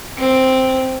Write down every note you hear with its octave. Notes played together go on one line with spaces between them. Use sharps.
C4